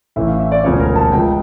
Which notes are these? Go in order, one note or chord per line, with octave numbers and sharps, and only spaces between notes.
A1 A2 E3 E5
F5
E5
D5
E1 D2 C#3 F3 C#5
A#4
A5
C#2 C#3 F3 G5